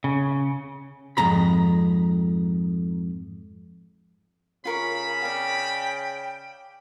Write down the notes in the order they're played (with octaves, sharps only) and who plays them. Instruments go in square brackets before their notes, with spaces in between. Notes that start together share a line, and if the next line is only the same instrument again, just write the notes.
[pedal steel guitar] C#3
[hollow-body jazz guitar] F2 G#2 A#5 B5
[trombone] C#3 [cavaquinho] F4 A#4 C#6 [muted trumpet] B5
[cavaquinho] D5 F5 [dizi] G5